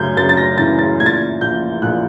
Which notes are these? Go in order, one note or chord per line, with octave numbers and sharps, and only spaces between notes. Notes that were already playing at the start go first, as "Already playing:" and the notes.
Already playing: F#2 C#3 G6 G#6
F#2 A6
A6
A#6
E3 A6
A6
A#2 G#6
A6
G#6
A#1 G6
A#1 F#6